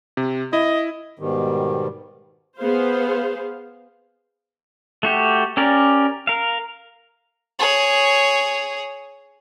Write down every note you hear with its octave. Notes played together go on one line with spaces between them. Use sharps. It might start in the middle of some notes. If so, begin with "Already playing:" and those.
C3
E4 D#5
G#2 B2 D#3 G3
B3 G#4 C5 F5
A3 F#4 G4
C#4 G4 A#4 D5
A#4 F5
G#4 C#5